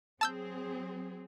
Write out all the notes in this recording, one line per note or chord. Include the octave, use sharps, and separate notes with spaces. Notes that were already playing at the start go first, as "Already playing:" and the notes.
F#3 C4 G#4 A5 E6 G6